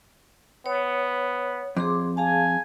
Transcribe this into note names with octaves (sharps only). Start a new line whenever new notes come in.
B3 C#5
F2 G#4 C6 D6
G#4 F5 G#5 A5